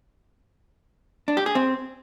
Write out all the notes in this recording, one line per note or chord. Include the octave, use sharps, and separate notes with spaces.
D4
G4
G#4
C4